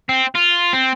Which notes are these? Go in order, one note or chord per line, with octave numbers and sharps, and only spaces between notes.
C4
F4
C4